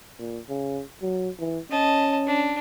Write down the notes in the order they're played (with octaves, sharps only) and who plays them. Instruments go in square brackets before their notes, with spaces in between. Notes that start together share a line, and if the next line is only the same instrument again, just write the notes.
[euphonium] A#2
C#3
F#3
E3
[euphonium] C#4 [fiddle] D#5 A5
[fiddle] D4